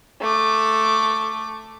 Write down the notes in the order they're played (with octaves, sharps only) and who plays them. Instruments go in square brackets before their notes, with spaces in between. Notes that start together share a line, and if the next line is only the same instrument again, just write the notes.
[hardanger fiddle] A3 D6